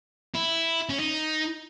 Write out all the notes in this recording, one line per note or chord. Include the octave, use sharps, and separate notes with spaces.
E4
C#4
D#4